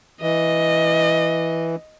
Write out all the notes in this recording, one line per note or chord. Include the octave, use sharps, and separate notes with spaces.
E3 D#5